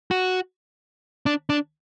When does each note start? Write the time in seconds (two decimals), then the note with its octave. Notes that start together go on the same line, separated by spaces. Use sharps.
0.11 F#4
1.26 D4
1.50 D4